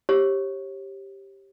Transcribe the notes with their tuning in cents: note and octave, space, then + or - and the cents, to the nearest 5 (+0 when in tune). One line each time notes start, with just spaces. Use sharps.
G4 +0 C#5 -40